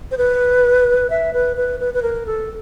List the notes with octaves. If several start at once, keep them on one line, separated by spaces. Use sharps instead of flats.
C5
B4
E5
B4
B4
B4
B4
A#4
A4